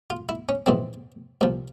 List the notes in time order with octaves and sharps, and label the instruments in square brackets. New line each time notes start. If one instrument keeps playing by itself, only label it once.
[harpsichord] F4
E4
C#4
A#1 G#2 E3 C4
C2 A#2 F3